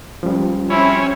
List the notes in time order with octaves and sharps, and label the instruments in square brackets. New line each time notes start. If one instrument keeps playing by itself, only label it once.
[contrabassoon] C#2 [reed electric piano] F3 G3
[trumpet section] C4 E4 [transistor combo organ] C#4